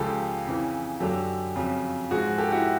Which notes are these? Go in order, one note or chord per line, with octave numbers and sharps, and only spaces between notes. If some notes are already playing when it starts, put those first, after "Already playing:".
Already playing: C#2 C#3 F3 G4 A4
F2 C#3 E3
F#2 D3 F#3 G4 A4
F2 C#3 F#3
G#2 F3 F#4 G#4
G4 A4
E4 F#4